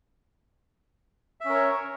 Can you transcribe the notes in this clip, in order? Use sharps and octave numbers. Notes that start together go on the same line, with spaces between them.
C#4 A#4 C#5 E5